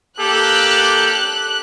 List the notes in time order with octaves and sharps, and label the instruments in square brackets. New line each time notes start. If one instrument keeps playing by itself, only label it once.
[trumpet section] A#3 G4 A4 [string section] F#6